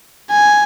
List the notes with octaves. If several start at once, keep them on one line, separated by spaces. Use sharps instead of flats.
G#5